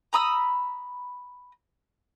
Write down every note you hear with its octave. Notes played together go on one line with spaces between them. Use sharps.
A#5 B5 D#6 E6